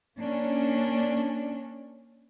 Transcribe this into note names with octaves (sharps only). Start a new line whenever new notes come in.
A#3 C#4 D4